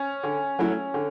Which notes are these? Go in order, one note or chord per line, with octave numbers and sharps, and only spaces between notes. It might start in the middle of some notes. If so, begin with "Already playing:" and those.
Already playing: C#4
D3
F#3 A3 E4
D3